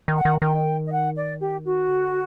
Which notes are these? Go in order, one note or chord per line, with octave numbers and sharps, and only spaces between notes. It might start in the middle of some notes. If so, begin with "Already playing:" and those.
D#3
F#5
D#3
D#3 G5
D#5
F#5
D5
G4
F#4
D3